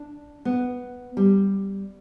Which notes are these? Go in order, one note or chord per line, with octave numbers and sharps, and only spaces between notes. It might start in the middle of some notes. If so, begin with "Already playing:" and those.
Already playing: D4
B3
G3